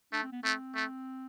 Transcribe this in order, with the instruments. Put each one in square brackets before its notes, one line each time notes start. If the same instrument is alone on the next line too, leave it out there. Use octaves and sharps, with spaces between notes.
[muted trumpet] A3 [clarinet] D4
[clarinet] C4
B3
[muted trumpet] A3 [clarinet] C4
[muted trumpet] A3